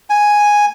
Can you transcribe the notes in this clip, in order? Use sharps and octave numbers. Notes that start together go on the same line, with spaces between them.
G#5